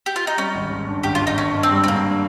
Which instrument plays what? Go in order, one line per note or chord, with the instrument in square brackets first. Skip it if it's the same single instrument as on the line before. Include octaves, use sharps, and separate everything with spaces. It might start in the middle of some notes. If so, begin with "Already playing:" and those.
[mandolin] G4
F4
D#4
[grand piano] G3 [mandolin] C#4
[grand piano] G#1
G#1
G2
[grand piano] G#1 [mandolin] G4
[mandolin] F4
[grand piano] G#1
[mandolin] D#4
[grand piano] G2 [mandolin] C#4
[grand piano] G2
[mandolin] C4
[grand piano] G3
[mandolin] C4
[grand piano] G2 [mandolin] A#3